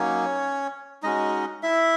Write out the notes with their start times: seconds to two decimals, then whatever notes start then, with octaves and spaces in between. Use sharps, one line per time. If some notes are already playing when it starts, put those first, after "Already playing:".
Already playing: F#3 A#3 C#4 D#4 C#5
1.03 G#3 C#4 D#4 F#4 D#5
1.63 E4 E5